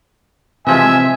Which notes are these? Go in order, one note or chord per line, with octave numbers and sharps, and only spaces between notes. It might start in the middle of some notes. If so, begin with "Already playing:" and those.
C3 E3 F3 G#3 E5 G#5